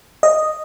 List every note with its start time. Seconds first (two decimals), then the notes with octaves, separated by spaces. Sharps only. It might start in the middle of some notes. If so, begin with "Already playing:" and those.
0.23 D#5